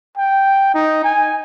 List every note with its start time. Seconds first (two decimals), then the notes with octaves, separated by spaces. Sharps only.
0.17 G5
0.74 D#4
1.04 G#5